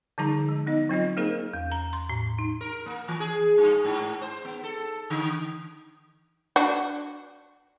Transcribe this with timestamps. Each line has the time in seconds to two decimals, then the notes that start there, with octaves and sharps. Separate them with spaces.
0.18 D3 F3 G3 D#4 G#4 A#5
0.49 G#3
0.67 B3 D#4 D#5
0.89 F#3 C4 F4 D#5
1.17 A#3 D#4 G#4 A#4 C5
1.53 E2
1.72 A#5
1.93 C6
2.09 A2
2.39 D#4
2.61 A#4
2.86 A#3
3.08 E3
3.20 G#4
3.58 G2
3.85 G#2
4.22 C5
4.45 B3
4.64 A4
5.10 D3
6.56 D4 F#4